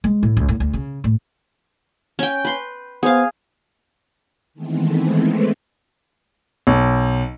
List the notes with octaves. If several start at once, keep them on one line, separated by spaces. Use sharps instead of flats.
G#3
A2
C#2
A2
D2
C#3
A2
C#4 G5
B4 C6
B3 G#4 C5 F5
D#3 E3 G#3 A3 B3 C4
B1